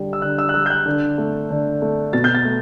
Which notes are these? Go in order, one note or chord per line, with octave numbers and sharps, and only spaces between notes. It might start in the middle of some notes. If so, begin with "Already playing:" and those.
Already playing: D3 G3
E6
D3 F#6
E6
F#6
G3 E6
G6
F#6
D3
A3
D3
A3
B2 A6
G6
A6
A3